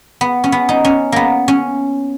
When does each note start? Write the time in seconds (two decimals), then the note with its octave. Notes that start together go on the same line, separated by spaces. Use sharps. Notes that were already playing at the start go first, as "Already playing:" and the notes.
0.21 B3
0.44 C#4
0.52 B3
0.69 D#4
0.85 C#4
1.12 A#3 B3
1.48 C#4